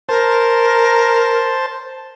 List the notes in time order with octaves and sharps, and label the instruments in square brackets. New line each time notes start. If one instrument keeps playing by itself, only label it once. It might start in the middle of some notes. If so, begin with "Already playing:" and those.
[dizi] A#4 [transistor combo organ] C5 A5